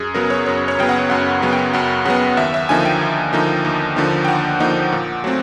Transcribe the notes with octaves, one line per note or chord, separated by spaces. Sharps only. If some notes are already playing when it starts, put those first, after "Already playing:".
Already playing: F#2 G#4
C#3 F#3 B3 A#4
C#5
F#2 C#5
C#5
C#3 F#3 B3 G5
F#5
F#2 F#5
C#3 F#3 B3
G5
F#2 F#5
C#3 F#3 B3 F#5
D#2 E5
E5
D3 F3 A#3 D#4 G#5
G5
D#2
D3 F3 A#3 D#4
D#2
D3 F3 A#3 D#4
G5
D#2 F#5
D3 F3 A#3 D#4
A#2
F#3 A3 C4